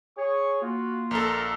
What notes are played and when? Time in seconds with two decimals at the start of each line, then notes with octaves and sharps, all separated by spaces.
0.17 G#4 C#5 C#6
0.62 A#3 F4 F#4
1.11 A#1 A4 A#4